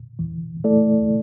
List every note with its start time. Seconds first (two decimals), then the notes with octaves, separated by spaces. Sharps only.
0.19 E3
0.64 A3 E4 A4 D5